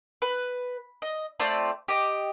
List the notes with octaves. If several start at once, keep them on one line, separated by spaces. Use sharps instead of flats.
B4
D#5
A3 C4 F4 D5
G4 D#5